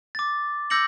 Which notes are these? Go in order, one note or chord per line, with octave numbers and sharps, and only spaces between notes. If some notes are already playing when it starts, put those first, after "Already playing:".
D6 A6
D6 E6 G6 A#6 C#7 F#7